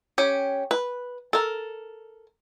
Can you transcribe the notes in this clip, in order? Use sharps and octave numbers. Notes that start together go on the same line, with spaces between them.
C#4 G4
B4
A4 A#4